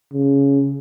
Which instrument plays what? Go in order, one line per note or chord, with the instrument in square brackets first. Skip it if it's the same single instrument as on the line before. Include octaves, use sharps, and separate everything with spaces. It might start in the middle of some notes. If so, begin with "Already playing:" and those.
[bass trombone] C#3